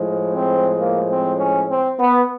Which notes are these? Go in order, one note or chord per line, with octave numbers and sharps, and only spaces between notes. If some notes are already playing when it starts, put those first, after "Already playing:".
Already playing: A2 F3 G#3
C4
A#3
C4
C#4
C4
B3